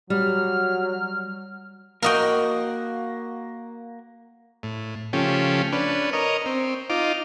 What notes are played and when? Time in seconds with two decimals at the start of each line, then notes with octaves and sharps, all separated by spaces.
0.10 F#3 G3 F6
2.02 A#3 F#4 A#4 D#5 G5
4.63 A2
5.13 C#3 F3 A3 C#4 G4
5.72 C#4 D4 B4
6.13 A#4 C#5 D#5
6.46 C4
6.90 D#4 F4 D6